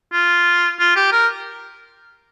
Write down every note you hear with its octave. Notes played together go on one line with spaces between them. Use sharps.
F4
F4
G4
A#4